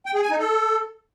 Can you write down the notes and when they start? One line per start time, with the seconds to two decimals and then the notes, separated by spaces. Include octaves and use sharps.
0.06 G5
0.14 G#4
0.22 G#5
0.31 D#4
0.39 A4